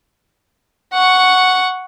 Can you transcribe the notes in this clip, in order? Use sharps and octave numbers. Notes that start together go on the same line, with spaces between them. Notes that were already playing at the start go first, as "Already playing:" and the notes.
F#5 C#6